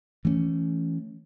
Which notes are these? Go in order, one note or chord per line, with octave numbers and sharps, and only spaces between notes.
E3 A3 B3 C#4